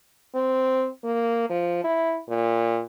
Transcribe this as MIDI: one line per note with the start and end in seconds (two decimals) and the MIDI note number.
0.35 0.88 60
1.04 1.45 58
1.50 1.82 53
1.84 2.18 64
2.29 2.81 46